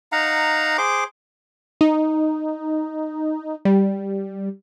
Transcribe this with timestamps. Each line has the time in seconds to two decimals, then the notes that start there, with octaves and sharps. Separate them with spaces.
0.12 D#4 F5 F#5 A#5
0.78 G#4 C5 C6 D6
1.81 D#4
3.65 G3